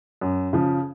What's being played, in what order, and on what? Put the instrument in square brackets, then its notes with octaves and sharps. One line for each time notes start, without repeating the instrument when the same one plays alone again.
[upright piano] F#2
C#3 F3